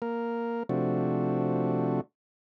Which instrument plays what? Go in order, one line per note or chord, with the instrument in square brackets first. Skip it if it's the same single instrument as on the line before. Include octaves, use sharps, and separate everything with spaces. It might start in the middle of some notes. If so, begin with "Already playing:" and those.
[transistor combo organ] A#3 A#4
C3 F3 A3 D4 F#4